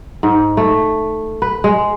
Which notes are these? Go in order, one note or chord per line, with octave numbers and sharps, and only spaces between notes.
G#2
A3
B4
G#3